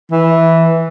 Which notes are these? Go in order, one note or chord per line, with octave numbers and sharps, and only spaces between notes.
E3